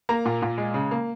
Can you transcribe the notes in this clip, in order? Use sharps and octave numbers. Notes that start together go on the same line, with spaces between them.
A#3 A#5
A#2
A#2
G#3
C#3
A#3